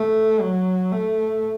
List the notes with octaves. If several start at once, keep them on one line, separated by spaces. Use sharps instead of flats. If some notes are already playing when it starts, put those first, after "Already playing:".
Already playing: A3
F#3
A3